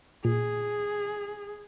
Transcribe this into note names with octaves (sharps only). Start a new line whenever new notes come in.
A#2 G#4